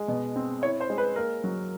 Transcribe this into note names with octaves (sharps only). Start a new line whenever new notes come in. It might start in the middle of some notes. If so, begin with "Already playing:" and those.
Already playing: G#3
B2
C4
E4 C#5
C5
G#3
B4
A#3 A#4
F#3